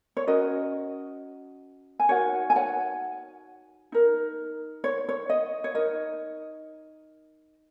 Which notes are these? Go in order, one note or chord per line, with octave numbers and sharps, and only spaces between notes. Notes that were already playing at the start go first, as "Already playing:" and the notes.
C#5
C#4 F#4 A#4 D#5
G#5
D#4 F#4 A#4 C#5 F#5
G#5
C#5 F#5
D#4 A#4
C#5
C#5
D#5
C#5
D#4 A#4 D#5